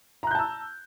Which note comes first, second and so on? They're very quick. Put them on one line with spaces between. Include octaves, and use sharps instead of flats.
A#5 F#6 G6 A5 E6